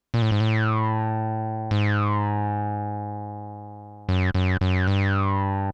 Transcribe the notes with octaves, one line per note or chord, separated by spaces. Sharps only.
A#2
A2
G#2
A2
G#2
F#2
F#2
F#2
G2